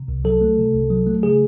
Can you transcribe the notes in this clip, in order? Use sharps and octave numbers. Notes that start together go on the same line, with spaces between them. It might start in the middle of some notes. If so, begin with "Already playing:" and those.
Already playing: C3
C2
F#3 A4
A3
C3
C2
F#3
A3
C#3 G#4